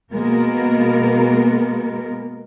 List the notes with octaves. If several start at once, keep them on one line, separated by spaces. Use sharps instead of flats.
B2 G#3 A#3 B3 A#4